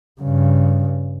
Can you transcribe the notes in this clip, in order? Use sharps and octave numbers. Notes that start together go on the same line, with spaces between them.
G2 C#3